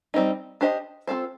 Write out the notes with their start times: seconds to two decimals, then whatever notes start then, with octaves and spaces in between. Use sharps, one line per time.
0.14 G3 C4 D#4
0.61 D4 G4 C5 D#5
1.07 C4 F4 A4 C5